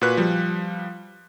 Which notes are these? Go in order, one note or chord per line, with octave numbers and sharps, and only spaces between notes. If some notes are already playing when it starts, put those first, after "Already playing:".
A#2 F#4 B4 F#6
F3 G3